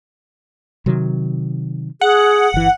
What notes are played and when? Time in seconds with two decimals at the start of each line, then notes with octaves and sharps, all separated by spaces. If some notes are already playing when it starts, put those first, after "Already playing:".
0.86 C3 D#3 F#3
2.01 G#4 F#5
2.54 G1 E3